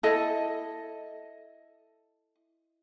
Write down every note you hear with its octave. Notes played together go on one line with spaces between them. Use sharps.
E4 A4 D#5